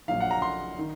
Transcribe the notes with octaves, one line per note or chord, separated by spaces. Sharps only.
A#1 A#2 F#3 F5
F#5
A#5
C6
D#3